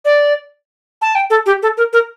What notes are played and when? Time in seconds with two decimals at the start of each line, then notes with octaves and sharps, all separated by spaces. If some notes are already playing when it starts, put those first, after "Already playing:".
0.05 D5
1.02 A5
1.15 G5
1.30 A4
1.46 G4
1.63 A4
1.77 A#4
1.93 A#4